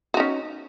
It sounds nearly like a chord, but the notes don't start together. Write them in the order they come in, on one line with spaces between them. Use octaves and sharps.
F#4 D#4 C#4